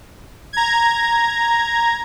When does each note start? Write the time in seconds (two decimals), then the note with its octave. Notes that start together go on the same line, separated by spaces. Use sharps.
0.53 A#5 G#6